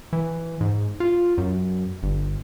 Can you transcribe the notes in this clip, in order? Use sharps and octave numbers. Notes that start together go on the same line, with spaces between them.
E3
G#2
F4
F#2
G1